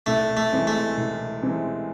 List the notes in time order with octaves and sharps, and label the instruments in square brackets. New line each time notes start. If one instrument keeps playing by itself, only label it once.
[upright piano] C2 [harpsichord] A3
[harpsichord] A3
[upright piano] C3 E3 G#3 C4
[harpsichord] A3
[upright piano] C2
C3 E3 G#3 C4